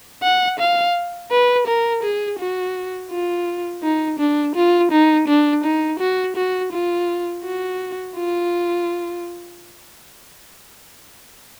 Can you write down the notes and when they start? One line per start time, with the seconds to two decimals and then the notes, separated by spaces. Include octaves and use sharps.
0.23 F#5
0.59 F5
1.31 B4
1.67 A#4
2.03 G#4
2.39 F#4
3.11 F4
3.83 D#4
4.19 D4
4.56 F4
4.92 D#4
5.28 D4
5.64 D#4
5.99 F#4
6.36 F#4
6.72 F4
7.44 F#4
8.16 F4